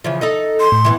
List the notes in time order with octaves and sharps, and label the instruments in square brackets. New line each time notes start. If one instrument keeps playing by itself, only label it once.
[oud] C#3 E3 F3
D#4 A4 D#5
[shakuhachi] C6
[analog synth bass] A2
[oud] E3 G#3 B3